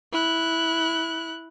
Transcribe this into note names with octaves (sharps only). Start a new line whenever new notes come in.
E4 F#6